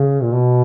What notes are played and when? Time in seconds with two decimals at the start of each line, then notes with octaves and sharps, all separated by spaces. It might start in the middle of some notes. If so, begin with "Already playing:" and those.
Already playing: C#3
0.22 A#2
0.33 B2